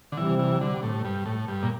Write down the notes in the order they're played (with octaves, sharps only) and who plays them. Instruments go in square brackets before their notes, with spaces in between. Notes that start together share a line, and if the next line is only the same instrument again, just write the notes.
[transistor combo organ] D3
[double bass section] C3 G3 C4 [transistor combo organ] E3
[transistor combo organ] E3
D3
A2
G2
A2
G2
A#2